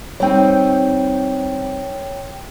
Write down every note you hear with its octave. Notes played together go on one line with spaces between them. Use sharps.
G3 C4 D#4 C#5 G5